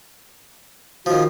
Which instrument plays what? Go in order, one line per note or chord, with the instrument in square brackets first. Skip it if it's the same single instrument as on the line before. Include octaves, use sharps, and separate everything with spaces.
[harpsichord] D#2 F3 [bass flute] F#4